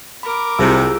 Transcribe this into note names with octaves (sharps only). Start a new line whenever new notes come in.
A#4 B5 D6
C2 C3 F4 G#4 E6